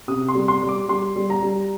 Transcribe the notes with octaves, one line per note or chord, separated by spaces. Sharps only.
C3 D#6
C6
G3
C6
G3
D6
G3 C6
G3
A#5
G3